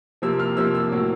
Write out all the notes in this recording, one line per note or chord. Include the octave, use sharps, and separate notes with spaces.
C3 F3 A#3 E6
F6
C3 F3 A#3 E6
E6
A2 F#3 A#3